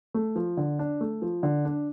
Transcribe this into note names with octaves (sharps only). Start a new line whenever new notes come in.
A3
F3
D3
D4
A3
F3
D3
D4